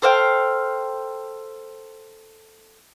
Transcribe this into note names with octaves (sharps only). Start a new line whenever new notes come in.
A4 C5 F5 G5